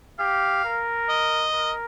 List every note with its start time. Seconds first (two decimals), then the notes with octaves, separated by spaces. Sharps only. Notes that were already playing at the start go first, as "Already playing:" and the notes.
0.19 G4 F5
0.65 A#4
1.09 D#5
1.54 A#4